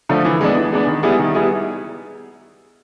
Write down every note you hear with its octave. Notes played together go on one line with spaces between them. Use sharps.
D3 F3 A3
E3
G#3 B3 D4
E3
G#3 B3 D4
D#3
G3 B3 E4 G#4
D#3
G3 B3 E4 G#4